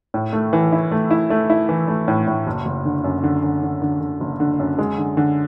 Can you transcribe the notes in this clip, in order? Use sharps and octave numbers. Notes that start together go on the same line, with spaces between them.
A2
A3
E3
E4
A3
E4
A3
E4
E3
A3
A2
A2
F#1
F#1
D3
F#2
D3
D3
D3
D3
D3
F#1
D3
F#2
G#3
D3
D3